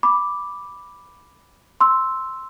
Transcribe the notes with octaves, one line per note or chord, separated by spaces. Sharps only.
B5 D6
C6 E6